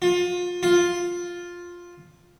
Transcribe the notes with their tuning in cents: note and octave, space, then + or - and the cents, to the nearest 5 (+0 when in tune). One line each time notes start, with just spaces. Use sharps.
F4 +25
F4 +5